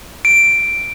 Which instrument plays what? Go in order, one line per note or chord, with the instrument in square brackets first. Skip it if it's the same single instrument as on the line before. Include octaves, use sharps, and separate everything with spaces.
[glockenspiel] D7